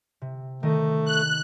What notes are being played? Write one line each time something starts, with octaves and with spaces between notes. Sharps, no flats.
C3
D#3 A3 D#5
F#6